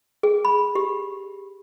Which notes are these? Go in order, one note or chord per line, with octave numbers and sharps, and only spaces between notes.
G#4
B5
G4